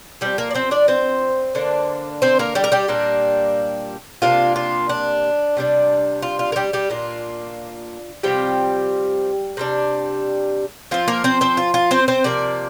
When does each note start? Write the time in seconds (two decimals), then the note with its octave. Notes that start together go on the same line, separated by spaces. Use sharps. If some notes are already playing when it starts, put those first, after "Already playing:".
0.21 F3 G3 C4 G4
0.38 A#3 A#4
0.51 D5
0.55 C4 C5
0.71 D4 D5
0.88 C4 C5
1.55 D3 A#3 D4
2.22 C4 C5
2.39 A#3 A#4
2.55 G3 G4
2.64 A#4
2.72 G3 G4
2.88 A#2 G3 A#3 D4
4.22 C3 A#3 D4 F4
4.56 F4
4.89 D4
5.57 C3 G3 D4
6.22 F4
6.39 F4
6.52 A#4
6.56 G3 G4
6.73 G3 G4
6.90 A#2 A#3 D4 F4
8.23 C3 F3 G3 C4 G4
9.57 C3 G3 D4
10.91 F3 C4 F4
11.08 A#3 A#4
11.24 C4 C5
11.41 C4 C5
11.57 F4
11.74 F4
11.91 C4 C5
12.08 C4 C5
12.24 C3 F3 A#3 D5